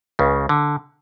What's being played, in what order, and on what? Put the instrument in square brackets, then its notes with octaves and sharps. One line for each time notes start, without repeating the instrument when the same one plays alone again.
[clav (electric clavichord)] C#2 C#3
D3